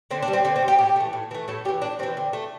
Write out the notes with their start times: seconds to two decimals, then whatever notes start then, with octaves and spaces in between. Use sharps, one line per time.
0.10 D3 C4
0.22 D4
0.28 G3
0.33 C4
0.45 D3 C4
0.56 C4
0.62 G3
0.68 G4
0.78 A2 G4
0.96 E3 A3
1.13 A2
1.31 E3 A3
1.48 A2 A4
1.65 G3 G4
1.68 E3
1.82 A2 D4
1.99 E3 G3 C4
2.17 D3
2.33 A3